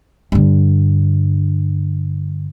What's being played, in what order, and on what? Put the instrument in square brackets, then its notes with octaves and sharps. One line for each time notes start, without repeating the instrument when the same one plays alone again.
[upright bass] G2 D3